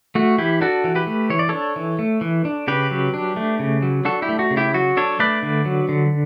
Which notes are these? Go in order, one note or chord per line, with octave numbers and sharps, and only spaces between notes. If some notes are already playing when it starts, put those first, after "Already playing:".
A3 F#4
E3 E4 G4
D4 F#4 A4
E3
G4 B4
A3
E3 C#5
D5
D4 A4 C#5
E3
A3
E3
D4
C#3 G4 B4
F#3
D4
A3
C#3
F#3
D4 F#4 A4
E4 G4
A3
F#4
C#3
E4 G4
F#3 F#4
D4 A4 C#5
A3 B4 D5
D3
F#3
D3